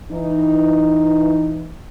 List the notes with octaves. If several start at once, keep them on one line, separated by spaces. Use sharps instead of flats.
E3 D#4